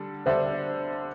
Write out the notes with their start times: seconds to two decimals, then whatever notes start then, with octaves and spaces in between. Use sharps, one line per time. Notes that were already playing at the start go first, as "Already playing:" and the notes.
Already playing: D3 G3 D4 A4
0.26 D3 G3 D4 A4 C5 E5